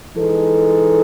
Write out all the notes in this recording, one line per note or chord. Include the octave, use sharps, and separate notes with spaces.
E3 G#3 D#4 A4